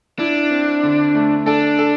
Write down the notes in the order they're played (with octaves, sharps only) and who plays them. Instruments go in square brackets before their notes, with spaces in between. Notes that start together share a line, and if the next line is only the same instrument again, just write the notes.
[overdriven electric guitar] D4 [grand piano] E4
[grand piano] C4
D3
A3
[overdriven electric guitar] D4 [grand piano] A4
[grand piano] A4